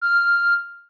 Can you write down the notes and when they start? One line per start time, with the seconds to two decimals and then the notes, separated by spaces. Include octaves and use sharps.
0.01 F6